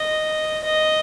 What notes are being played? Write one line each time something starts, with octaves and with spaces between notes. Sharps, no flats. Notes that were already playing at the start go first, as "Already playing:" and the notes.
Already playing: D#5
D#5